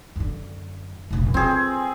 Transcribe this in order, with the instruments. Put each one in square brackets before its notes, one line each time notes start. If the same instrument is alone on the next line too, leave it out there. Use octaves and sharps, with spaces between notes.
[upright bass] F#2 D3
F1 A#1
[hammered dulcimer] C4 G#4 [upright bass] F4